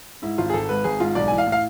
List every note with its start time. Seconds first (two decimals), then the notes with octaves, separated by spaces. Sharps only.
0.22 G#2 E4
0.38 G#1 F4
0.50 G#4
0.53 G#1 A4
0.69 G#2 B4
0.84 G#1 G#4
1.00 G#2 F4
1.15 B1 D5
1.28 E3 G#5
1.38 F5
1.47 A2
1.52 F5